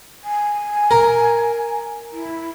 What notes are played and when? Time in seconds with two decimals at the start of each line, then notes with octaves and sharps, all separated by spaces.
0.24 G#5
0.91 A#4
2.12 E4